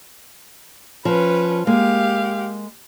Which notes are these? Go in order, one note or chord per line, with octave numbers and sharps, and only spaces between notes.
F3 C#4 B4
G#3 A#3 G4 F5